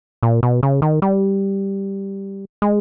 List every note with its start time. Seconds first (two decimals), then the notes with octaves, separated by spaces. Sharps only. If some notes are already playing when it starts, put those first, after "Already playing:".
0.23 A#2
0.43 B2
0.63 C#3
0.82 D#3
1.02 G3
2.62 G#3